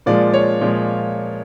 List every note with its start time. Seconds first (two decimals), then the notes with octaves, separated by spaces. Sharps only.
0.06 A#2 F3 G#3 D5
0.34 C#5
0.61 A#2 F3 G#3